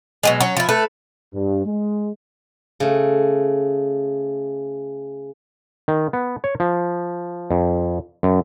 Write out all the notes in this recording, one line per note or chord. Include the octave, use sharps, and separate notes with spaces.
B2 F#3 G#3
F#3 C#4
F3 E4
A3 A4 B4
G2
G#3
C#3 A3
D#3
B3
C#5
F3
F2
F#2